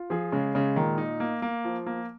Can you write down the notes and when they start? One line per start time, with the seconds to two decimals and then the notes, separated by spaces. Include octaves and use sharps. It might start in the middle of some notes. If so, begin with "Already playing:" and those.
Already playing: F4
0.10 F3 G#4
0.32 C#3 G#3
0.55 C#3 G#3
0.76 A#2 D#3
0.98 D#4
1.20 A#3
1.42 A#3
1.65 F3
1.87 A#3